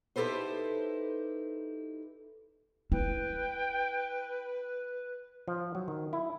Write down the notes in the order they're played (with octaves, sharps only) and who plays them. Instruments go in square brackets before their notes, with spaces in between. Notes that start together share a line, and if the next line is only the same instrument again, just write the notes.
[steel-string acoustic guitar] D#4 E4 G4 A4 B4 C5
[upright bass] E4 [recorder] B4 [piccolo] G5
[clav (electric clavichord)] F3
F#3
D#3
E4